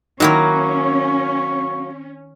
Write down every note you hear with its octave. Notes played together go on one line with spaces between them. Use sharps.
D#3 F#3 A#3 C#4 E4 C#5 C#6